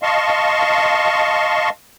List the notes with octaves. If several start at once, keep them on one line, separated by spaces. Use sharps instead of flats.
D#5 F5 A5 C6 C#6